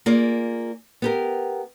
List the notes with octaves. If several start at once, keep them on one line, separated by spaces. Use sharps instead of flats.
A#3 F4 G#4 D5
B3 G4 A#4